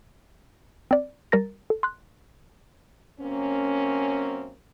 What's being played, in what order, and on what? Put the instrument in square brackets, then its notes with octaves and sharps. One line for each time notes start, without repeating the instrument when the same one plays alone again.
[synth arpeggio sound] C4 D5
G3 A#4 A#5 A6 A#6
A4
C6 F#6
[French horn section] F#2 A#3 C4 C#4